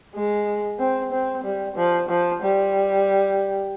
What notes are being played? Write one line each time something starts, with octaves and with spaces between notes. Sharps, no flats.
G#3
C4
C4
G3
F3
F3
G3